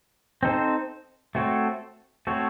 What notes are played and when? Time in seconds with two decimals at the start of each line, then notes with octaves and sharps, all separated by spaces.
0.43 C4 D#4 A4 C5
1.35 A3 C4 F#4 A4 C#5
2.27 A3 C4 F#4 A4 C#5